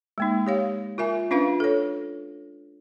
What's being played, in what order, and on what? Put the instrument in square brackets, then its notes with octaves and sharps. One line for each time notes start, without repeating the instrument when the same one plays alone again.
[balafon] G#3 A#3 D#4
G4 C#5 F5
F4 A#4 E5 G#5
C#4 D4 F4 B4 F5
A4 C#5